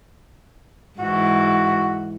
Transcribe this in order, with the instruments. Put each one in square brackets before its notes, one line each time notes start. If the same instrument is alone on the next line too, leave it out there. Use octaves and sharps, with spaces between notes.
[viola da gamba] G#2 E3 [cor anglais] F#4